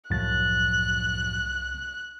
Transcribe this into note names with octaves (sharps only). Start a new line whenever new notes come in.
C2 F#2 A2 F3 F#6 A6